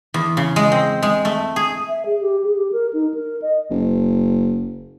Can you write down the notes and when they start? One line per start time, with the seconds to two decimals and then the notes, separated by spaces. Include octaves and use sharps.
0.14 E2
0.37 C#3
0.56 G#3
0.72 C4
1.03 G#3
1.25 A3
1.56 G#4
1.88 E5
2.05 G#4
2.21 G4
2.44 G#4
2.56 G4
2.72 A#4
2.93 D#4
3.14 A#4
3.42 D#5
3.70 F#1